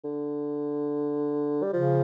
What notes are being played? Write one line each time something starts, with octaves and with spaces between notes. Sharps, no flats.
D3
G3
C#3 F3